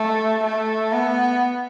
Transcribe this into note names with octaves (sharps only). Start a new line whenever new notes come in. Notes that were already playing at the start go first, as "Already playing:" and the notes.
Already playing: A3
A3
B3